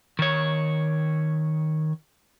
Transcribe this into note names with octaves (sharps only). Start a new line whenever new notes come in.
D#3 C#5